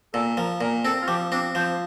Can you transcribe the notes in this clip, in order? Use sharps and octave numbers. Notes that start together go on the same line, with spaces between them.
A#2 A4
F3 A#4
A#2 A#4
C4 A4
F4
F3 G4
C4 D4
F3 C5